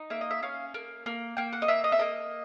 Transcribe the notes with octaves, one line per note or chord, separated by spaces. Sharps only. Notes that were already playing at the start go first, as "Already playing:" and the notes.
Already playing: D#4
A#3 E5
D#5
E5
C#4 F5
A#3
A#3
A#3 G5
F#5
D#5
A#3 E5
D#5
E5
A#3 D#5